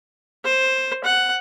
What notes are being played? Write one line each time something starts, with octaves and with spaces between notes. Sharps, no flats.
C5
F#5